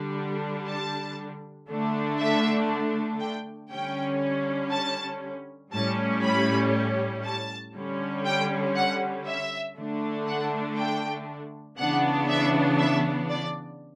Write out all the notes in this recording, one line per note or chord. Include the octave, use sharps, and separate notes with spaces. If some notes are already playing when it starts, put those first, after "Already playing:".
Already playing: D3 G3 D4
A5
D3 A3 D4
E5
G5
D3 G3 C#4 G5
A5
A2 G3 C#4 A5
B5
A5
D3 G3 C#4
G5
F#5
E5
D3 A3 D4
F#5
G5
C#3 E3 B3 D4 F#5
E5
E5
D5